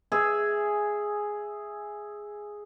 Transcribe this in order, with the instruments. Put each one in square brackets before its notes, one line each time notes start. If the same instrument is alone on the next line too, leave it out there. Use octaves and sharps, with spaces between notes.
[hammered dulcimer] G#4 E5